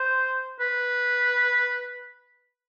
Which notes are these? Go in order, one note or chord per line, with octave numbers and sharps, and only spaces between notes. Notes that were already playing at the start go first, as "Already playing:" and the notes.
Already playing: C5
B4